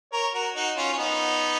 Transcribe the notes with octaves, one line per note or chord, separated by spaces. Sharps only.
A#4 C#5
F#4 A#4
D#4 F#4
C#4 F4
C#4
B3 D#4